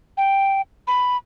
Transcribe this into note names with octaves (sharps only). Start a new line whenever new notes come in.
G5
B5